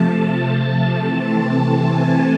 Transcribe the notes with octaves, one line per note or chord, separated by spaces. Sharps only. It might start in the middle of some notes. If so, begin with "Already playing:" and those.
Already playing: C3 F3 A3 A5
C3 E3 A3 C4
G#5